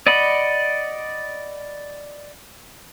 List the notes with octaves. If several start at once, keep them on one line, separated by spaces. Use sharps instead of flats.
D5 D#5 F#5 B5